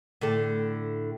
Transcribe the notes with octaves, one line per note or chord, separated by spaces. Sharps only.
A2 D3 A4